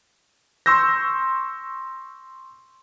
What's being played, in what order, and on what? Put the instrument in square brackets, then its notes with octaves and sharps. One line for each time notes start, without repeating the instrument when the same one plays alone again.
[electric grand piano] C6 C#6 E6 G6 A#6